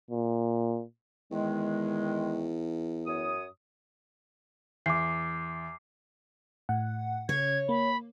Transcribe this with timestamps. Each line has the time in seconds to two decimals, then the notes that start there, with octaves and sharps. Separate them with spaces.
0.11 A#2
1.31 E2 D#3 G#3
3.07 F#2 C#5 D#6
4.86 E2 D6 C7
6.69 A2 F#5
7.29 C#3 C#5 G#6
7.69 A#3 B5